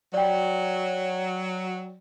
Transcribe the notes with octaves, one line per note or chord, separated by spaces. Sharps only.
F#3 D5 G5